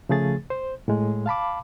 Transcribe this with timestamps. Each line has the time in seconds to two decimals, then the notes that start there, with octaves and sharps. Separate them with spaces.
0.09 C#3 F3 A3 G#4 A6
0.50 C5
0.88 A2 G#3
1.26 F5 A5 B5 D6